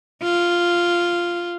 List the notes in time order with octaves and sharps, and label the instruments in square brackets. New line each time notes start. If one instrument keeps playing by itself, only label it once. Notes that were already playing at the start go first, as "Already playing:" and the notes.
[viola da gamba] F4